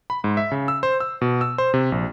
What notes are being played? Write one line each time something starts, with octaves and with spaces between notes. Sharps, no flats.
B5
G#2
E5
C#3
E6
C5
E6
B2
E6
C5
C3
A#1